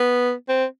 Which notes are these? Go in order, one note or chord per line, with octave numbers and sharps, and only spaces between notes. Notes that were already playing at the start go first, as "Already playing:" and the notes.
Already playing: B3
C4